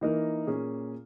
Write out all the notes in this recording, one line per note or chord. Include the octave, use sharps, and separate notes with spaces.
E3 A#3 D#4 A#4
A#2 A#3 C#4 G#4